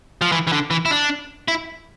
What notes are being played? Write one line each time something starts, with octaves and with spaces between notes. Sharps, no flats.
F3
E3
E3
D3
E3
E4
D4
E4